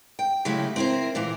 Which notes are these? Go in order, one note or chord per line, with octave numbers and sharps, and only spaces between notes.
G5
C#3 F#3 G#3 A3 E4 G4
C4 E4 G4 A#4 C5
A#2 E3 A#3